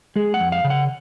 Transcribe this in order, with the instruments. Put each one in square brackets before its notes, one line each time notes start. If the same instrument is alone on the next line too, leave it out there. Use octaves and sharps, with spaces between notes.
[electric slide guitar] G#3 G#4
F#5
F2
F5
C#3
F#5